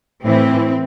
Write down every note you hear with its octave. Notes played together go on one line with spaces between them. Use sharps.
A2 E3 C4